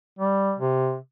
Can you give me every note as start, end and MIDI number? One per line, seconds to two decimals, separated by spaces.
0.18 0.54 55
0.59 0.96 48